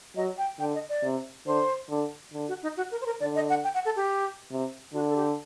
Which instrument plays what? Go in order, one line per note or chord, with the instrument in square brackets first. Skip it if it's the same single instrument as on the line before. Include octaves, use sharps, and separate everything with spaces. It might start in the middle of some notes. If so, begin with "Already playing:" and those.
[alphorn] F#3 [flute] D#5
[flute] G5
[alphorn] D3 [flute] G5
[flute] D#5
D5
[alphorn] C3
[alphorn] D3 [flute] C5
[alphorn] D3
D3
[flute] F#4
D#4
F#4
A#4
C5
A#4
[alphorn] D3 [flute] D5
[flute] D#5
F#5
G5
F#5
A4
G4
[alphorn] C3
[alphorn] D3 [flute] F#4
[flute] A4
G4